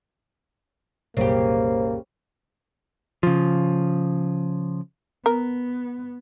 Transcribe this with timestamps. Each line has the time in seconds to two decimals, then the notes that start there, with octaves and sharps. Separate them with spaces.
1.17 C2 F#2 A#2 C#3 A#3 G4 C5
3.23 C#3 F3
5.26 B3 A#4